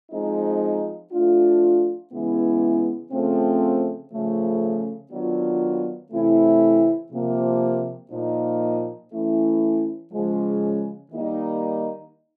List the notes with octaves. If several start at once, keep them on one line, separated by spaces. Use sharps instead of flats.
F3 G#3 C4 D#4
F3 A3 D4 F4
C#3 E3 G#3 B3 E4
C#3 F3 A3 C4
C#3 F3 A3
D#3 F#3 B3 D4 F4
C3 E3 A3 C4 E4
C3 F3 A#3
A#2 F3 A#3 D#4
E3 A3 C#4 E4
C#3 F3 G#3
D#3 G3 A#3 D#4